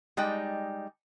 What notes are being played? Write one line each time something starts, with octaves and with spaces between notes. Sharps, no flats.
G3 G#3 D#4 D5 D#5 G5